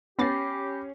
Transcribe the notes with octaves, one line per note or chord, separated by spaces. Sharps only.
B3 C#4 G4 B5 D6 A6 A#6 C7